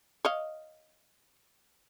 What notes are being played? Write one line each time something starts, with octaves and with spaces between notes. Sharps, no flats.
C#5 D#5 F5